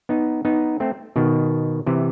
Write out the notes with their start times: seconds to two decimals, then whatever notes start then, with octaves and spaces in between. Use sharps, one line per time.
0.09 B3 D#4
0.45 B3 D#4
0.80 A3 C4
1.16 B2 D#3
1.86 C3 E3